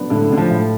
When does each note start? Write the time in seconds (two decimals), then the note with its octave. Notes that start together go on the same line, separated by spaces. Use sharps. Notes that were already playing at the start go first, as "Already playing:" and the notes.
Already playing: F#3 B3 D4
0.10 A2 D3
0.31 A2 D3
0.37 F3
0.51 A2